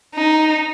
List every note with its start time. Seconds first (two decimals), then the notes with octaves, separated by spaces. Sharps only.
0.15 D#4